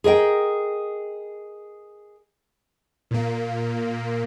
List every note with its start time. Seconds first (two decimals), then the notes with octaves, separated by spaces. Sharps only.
0.04 G#4 A#4 D#5 G5
3.11 A#2 A#3